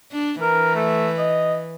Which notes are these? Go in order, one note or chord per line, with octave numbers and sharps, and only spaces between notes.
D4
E3 A#4
A3
D#5